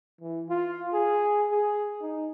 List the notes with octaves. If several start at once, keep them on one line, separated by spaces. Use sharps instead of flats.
E3
F4
G#4
G#4
D#4